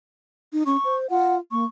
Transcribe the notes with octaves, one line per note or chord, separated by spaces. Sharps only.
D#4
C#4 C#6
C5
F4 F#5
A#3 C#6